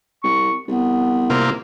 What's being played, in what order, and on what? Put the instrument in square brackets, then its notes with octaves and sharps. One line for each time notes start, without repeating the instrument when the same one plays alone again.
[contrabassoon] C2 [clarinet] C#6
[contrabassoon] C2 [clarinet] B3
[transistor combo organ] C3 A#3 F4